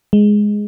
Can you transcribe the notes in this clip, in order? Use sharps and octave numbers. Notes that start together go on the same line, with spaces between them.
G#3